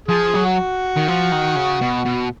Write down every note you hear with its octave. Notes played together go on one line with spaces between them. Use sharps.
F3 G#4
F#3
F#4
D#3
F3
D#3
C#3
B2
B2